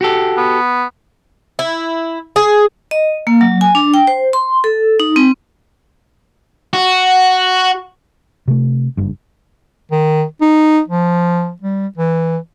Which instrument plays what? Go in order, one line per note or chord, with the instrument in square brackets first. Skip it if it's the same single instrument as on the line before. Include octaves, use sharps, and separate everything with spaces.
[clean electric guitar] F#4 G4 A4
[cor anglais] B3
[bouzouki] E4
G#4
[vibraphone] D#5
A#3
F#3
G#5
D4
G5
C5
C6
A4
D#4
C4
[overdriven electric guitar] F#4
[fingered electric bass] C3 A3
F#1 G2
[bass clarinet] D#3
D#4
F3
G3
E3